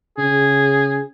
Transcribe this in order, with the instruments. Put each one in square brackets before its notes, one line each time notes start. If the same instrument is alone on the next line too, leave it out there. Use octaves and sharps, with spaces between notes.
[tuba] C#3 [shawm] G#4